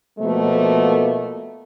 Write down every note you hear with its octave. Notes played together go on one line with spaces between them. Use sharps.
B2 F3 A3 A#3